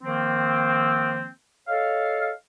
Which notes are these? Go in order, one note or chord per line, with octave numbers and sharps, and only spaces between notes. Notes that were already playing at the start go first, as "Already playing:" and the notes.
D#3 F3 A#3 C4
A4 C#5 D#5 F5